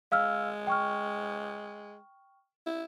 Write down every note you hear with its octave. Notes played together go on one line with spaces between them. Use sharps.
G#3 F5 E6 F6
G5 C#6 F6
E4